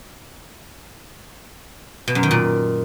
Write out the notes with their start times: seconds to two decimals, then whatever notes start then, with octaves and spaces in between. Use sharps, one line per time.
2.08 B2
2.15 F#2
2.23 D#3
2.31 A#2